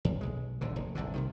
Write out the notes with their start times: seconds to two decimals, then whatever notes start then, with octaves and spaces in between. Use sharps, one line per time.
0.05 D#2
0.21 B1 G#3
0.61 D#1 A#2 D3
0.76 F1
0.95 G1 C2 G#2 D3
1.14 C2 C3 D#3